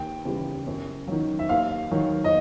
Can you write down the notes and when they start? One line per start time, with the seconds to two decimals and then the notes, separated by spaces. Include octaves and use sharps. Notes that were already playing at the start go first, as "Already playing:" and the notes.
Already playing: D#2 G5
0.25 C#3 E3 G3
0.67 F#2
1.08 D#3 F#3
1.39 E5
1.49 D#2 F5
1.91 D#3 F#3
2.24 D#5